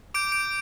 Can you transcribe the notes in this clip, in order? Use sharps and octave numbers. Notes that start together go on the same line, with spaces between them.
D6 G6 D7
D7